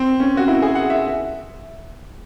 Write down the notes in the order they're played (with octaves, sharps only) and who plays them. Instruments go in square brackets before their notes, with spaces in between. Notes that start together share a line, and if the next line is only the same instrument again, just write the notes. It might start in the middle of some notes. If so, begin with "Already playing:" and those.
Already playing: [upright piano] C4
C#4
F#4
E4
G#4
F#5
E5